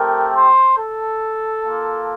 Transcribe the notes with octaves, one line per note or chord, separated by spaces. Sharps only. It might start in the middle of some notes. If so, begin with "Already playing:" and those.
Already playing: A3 C4 G4 A#4
C5
A4
A#3 F4